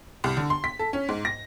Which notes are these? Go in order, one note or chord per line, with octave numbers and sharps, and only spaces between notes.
C2
D3
C6
B6
A4
C#4
G#2
A#6